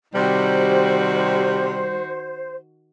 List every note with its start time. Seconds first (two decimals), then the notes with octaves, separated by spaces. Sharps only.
0.15 C3 D#3 G3 F#4 C5